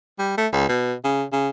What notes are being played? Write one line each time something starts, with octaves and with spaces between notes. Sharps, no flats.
G3
A3
C#2
B2
C#3
C#3